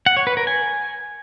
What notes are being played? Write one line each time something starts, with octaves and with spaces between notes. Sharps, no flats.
F#5
C#5
B4
A#4
G#5